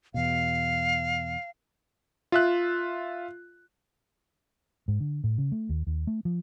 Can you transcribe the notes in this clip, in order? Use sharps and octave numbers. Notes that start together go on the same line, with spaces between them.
E2 B2 F5
F4 E5 F#6
G#2
D3
A2
C#3
A3
D#2
D#2
A3
F3